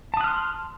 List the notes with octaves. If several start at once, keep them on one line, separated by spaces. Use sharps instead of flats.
A5 C6 D#6 F6 F#6